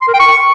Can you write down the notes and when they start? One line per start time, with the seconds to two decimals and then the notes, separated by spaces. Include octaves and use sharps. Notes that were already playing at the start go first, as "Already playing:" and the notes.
0.02 C6
0.08 A#4
0.14 G5
0.20 C#6